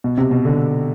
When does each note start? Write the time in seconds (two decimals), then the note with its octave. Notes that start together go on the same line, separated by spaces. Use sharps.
0.04 B2
0.18 C3
0.31 B2
0.45 D3